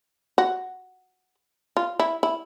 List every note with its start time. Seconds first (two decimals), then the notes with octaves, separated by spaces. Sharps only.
0.38 F#4
1.77 F4
2.00 E4
2.23 E4